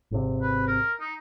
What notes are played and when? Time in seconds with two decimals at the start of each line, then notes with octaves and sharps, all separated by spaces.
0.11 G#1 C3
0.42 B4
0.68 A#4
1.00 D#4